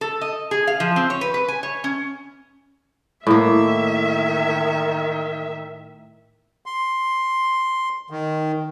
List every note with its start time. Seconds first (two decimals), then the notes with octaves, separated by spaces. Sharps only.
0.01 A4
0.21 D#5
0.51 G#4
0.67 F5
0.80 F3
0.96 C4
1.10 C#5
1.21 B4
1.34 B4
1.48 G#5
1.63 C#5
1.84 C#4
3.27 A2 D#3 A#3 E5
6.66 C6
8.10 D#3